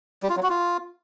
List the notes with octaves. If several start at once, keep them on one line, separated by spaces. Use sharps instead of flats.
G3
F4
F#3
F#4
F4